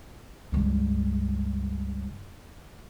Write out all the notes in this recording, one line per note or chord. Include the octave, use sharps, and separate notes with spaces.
C#2 G2